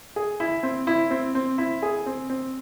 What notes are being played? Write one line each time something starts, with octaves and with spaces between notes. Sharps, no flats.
G#4
E4
C4
E4
C4
C4
E4
G#4
C4
C4